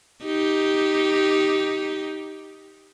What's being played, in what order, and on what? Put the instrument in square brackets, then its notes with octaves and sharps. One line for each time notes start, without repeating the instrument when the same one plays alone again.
[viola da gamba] D#4 G4